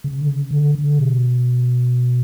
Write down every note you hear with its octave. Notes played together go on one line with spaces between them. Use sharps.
C#3
D3
C#3
D3
D3
B2